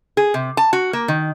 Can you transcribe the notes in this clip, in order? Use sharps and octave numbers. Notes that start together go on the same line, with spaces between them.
G#4
C3
A5
F#4
A#3
D#3